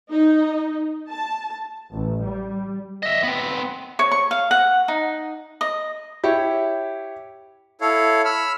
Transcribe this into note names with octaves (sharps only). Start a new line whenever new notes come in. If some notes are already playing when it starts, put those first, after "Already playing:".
D#4
A5
A1
G3
D#5 E5
B3 C4
C#5
C#6
F5
F#5
D#4
D#5
E4 G4 C#5 E5
E4 A4 C#5 F5
B5 E6 F6